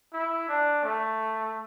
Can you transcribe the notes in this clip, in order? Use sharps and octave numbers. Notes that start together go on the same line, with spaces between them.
E4
D4
A3